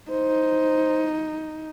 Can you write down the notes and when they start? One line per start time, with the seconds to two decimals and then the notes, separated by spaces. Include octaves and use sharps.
0.11 D#4 C5